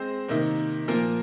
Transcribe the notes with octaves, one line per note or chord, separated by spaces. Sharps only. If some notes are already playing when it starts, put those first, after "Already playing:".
Already playing: G#3 C4 C5
C3 D#3 A#3 D#4
A#2 F3 A#3 F4 A#4